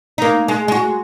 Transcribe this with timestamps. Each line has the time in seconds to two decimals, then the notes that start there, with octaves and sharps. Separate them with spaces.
0.18 A#3 D#4
0.48 G#3
0.68 G#3 F#4